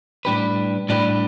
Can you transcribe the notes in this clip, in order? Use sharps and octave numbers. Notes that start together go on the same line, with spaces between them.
A2 G3 D4 G4 B4
A2 G3 D4 G4 B4